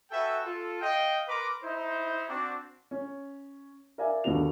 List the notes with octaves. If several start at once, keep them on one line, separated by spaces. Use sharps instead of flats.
F#4 A4 B4 E5 G5 G#5
F4 A4
D#5 F5 G5
A#4 B4 A#5 C6 D6
D#4 E4 C5
C4 D4 F#4
C#4
A#4 D5 E5 F5 G#5
D#2 D3 B3 D4 F#4 F7